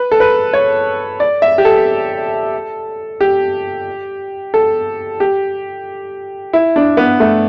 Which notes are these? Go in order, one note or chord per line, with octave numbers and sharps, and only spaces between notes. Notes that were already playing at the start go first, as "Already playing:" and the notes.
Already playing: B4
A4
B4
C#5
D5
E5
G4
A4
G4
A4
G4
E4
D4
B3
A3